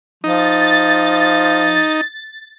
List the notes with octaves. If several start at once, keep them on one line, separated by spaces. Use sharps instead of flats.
F3 D#4 A6